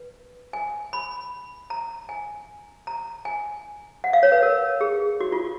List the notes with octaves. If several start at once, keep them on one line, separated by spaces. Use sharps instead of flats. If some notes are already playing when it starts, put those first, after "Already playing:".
Already playing: B4
G#5
B5
A#5
G#5
A#5
G#5
F#5
F5
C#5
B4
A#4
G#4
F#4
F4